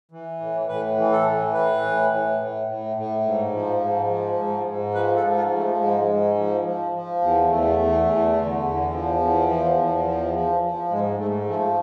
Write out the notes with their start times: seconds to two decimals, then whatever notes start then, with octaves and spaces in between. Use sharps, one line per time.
0.11 E3
0.40 A2
0.68 A2 B4
0.97 E3
1.12 A4
1.26 A2
1.54 E3 B4
1.82 A2
2.11 A2
2.40 A2
2.67 A2
2.96 A2
3.24 G#2
3.53 F3
3.81 G#2
4.10 F3
4.37 G#2
4.66 G#2
4.94 F3 B4
5.16 A4
5.22 G#2
5.36 F4
5.51 F3
5.58 A3
5.80 G#2 G#3
6.08 G#2
6.37 F3
6.64 F3
6.93 F3
7.21 E2
7.49 E2 A3
7.79 E2
8.06 E2
8.36 D3
8.64 E2
8.92 F3
9.20 E2
9.48 F3
9.77 E2
10.05 F3
10.33 F3
10.63 F3
10.90 G#2 G#3
11.18 G#2 A3
11.47 F3 A3